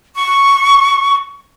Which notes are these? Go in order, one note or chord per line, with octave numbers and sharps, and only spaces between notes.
C#6